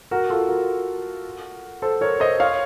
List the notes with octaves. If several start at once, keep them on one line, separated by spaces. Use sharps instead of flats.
F#4 A#4
F4 A4
F#4 A#4
A4 C5
A#4 C#5
C5 D#5
C#5 F5